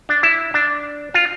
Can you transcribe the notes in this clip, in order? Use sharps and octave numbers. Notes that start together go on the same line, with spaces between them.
D4
E4
D4
F4